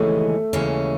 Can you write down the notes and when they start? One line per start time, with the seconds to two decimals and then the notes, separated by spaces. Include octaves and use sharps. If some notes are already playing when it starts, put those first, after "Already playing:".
Already playing: D#2 C#3 E3 G#3 A3 C#4
0.53 D#2 C#3 E3 G#3 C#4